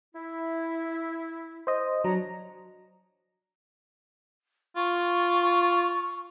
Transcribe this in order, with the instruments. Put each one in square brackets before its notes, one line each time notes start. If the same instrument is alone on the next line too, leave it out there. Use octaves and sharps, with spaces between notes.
[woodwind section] E4
[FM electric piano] C5 D#5
[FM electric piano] F#3 [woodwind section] D4 C#5 A#5
[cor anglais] F4 [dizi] C#6